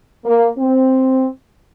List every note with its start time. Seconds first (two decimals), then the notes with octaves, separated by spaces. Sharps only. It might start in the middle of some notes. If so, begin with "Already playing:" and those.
0.25 A#3
0.57 C4